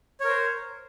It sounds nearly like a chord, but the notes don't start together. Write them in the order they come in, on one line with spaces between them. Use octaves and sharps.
C#5 A#4 C5